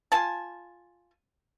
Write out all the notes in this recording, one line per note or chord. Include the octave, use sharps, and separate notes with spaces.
F4 G#5 A5